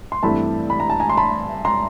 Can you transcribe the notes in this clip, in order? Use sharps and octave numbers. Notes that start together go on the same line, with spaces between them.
C6
G2 E3 A3 C4 A5 B5
B5
A#5
A5
G#5 A#5
C6
A5 B5
A#5 C6